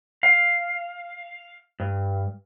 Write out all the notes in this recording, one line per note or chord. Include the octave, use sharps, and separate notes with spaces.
F5
G2